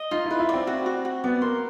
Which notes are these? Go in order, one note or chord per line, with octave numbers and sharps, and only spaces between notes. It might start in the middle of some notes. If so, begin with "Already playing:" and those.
Already playing: D#5
D#4 F4
E4 B4
E4
D5
C4
F#4
F#4
F#4
B3 D5
A#3 C6